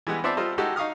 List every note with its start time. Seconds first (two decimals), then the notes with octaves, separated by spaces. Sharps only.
0.07 E3 G3 G#3 B3
0.24 B3 C4 C5 D5 E5 A5
0.37 G3 F4 A4 C5 D#5
0.58 G#3 D#4 F#4 G4 A4
0.76 D#4 F5 C#6 D#6 F6